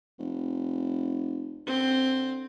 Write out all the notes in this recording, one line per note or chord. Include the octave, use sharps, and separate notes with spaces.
F1
D3 C4